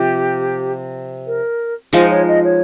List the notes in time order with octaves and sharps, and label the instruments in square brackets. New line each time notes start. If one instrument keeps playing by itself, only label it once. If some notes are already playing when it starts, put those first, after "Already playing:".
Already playing: [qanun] C3 F3 [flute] G4
[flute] A#4
[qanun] F3 G#3 D#4 [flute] C5
[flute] C#5
D#5
C#5